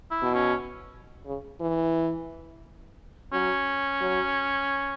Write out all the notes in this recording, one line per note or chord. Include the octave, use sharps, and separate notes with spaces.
E4
B2
C#4
C#3
E3
F#3 C#4
F#3